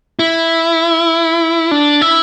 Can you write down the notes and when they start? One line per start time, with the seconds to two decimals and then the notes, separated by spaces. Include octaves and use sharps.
0.19 E4
1.71 D4
2.01 E4